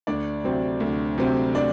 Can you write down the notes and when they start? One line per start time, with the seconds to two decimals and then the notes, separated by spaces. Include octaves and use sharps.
0.07 D2 D4 D5
0.44 C3 F#3 C4
0.80 D2
1.18 C3 F#3 C4
1.55 D4 D5